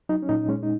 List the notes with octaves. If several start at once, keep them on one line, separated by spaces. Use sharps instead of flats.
F#3 D#4
C#4
A#2 D#4
G#3 C#4
D#4